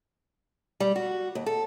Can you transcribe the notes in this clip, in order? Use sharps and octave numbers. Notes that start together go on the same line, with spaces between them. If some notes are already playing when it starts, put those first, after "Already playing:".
G3
F#4
D#2
A4